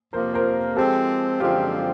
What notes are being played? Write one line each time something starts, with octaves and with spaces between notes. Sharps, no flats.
F2 C3 F3 A#3 A#4 C5
A#4 C5
F3 G#3 C4 G4 A4
F#2 D3 F3 G#3 C4 F4 G4